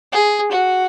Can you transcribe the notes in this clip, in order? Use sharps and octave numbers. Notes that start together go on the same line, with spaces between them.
G#4
F#4